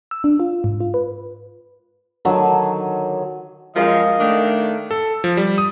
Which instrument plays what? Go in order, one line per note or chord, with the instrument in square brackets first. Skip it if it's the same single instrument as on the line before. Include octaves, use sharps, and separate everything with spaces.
[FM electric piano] E6
D4
F4
G#2
F4
B4
[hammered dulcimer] D3 D#3 F#3
[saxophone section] F#2 F3 [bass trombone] G#3 [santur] A#4 F5 [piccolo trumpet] D#5
[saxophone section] D#3 D4 [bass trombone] A3
[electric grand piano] A4
F3
G3
D#6